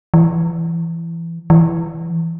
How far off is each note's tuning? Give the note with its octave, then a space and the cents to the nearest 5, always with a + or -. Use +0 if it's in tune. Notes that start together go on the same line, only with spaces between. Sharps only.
E3 +20
E3 +15